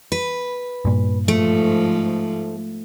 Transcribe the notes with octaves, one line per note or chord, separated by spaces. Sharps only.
B4
G2 A#2
G#2 F3 A3